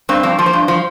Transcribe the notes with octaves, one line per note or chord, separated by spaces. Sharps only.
G2 C4
F3 A#3
F3
C5
G2
F3